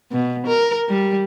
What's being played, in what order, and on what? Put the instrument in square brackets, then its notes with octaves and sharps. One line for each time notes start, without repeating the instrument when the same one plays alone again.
[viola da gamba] B2
A#4
G3